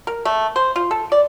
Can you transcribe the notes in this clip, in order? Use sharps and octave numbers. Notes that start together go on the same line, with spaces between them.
A#4
A3
C5
F4
A4
D5